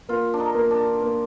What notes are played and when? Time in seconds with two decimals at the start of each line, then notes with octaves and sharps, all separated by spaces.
0.09 A#3 F4
0.34 D4
0.40 D#4
0.55 A#3
0.71 D4
1.02 A#3